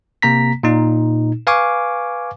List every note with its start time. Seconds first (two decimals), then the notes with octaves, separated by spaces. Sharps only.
0.22 C3 A#3 A#5 B6
0.63 A#2 D#4
1.47 B4 F5 G#5 C#6 D6